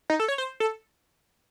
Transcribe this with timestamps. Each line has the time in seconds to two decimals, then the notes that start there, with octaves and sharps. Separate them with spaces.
0.10 D#4
0.20 A4
0.28 C#5
0.38 C5
0.60 A4